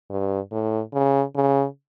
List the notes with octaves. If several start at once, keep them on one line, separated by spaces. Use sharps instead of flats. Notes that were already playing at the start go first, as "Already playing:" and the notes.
G2
A2
C#3
C#3